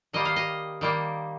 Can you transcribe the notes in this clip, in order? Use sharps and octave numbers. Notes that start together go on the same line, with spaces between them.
D#3 G3 A#3 D#5
F5
D#5
D#3 G3 A#3